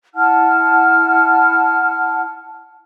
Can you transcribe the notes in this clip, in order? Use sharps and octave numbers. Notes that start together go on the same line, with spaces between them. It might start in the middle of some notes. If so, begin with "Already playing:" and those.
E4 F#5 A5 F6